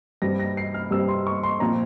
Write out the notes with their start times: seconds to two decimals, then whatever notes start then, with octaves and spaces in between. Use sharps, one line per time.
0.22 G2 G3 C4 A#6
0.40 A#6
0.57 C7
0.74 F6
0.91 G2 G3 C4 E6
1.08 C6
1.27 C#6
1.43 C6
1.60 A#2 F3 C4 A#5